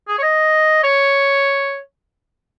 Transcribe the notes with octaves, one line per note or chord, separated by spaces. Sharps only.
G#4
C#5
D#5
C#5